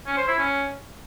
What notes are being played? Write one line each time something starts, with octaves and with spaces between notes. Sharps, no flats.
C#4
C5
E4
C#4